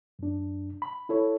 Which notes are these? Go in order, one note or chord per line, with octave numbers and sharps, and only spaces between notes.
F#2 D4
B5
E4 A4 C#5